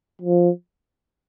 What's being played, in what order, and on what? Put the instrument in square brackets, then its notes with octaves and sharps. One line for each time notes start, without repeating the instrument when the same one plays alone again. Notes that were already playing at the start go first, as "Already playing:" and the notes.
[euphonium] F3